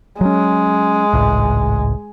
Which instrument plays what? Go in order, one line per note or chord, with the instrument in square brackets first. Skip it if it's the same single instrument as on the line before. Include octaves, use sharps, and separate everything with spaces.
[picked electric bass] F#3 C#4 [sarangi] G#3
[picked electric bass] G#1 C#2 A2